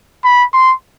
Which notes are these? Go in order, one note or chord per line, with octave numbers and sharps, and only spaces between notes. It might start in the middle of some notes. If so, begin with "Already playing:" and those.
B5
C6